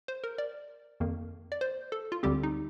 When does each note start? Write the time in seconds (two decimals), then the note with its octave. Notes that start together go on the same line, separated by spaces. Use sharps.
0.08 C5
0.24 A#4
0.38 D5
1.00 F2 D#3 A#3
1.52 D5
1.61 C5
1.92 A4
2.12 F4
2.23 D2 D3 G3 C4 G4
2.43 D#4